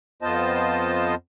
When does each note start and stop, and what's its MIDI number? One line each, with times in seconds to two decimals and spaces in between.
0.22 1.15 41
0.22 1.15 59
0.22 1.15 65
0.22 1.15 72
0.22 1.15 75
0.22 1.15 81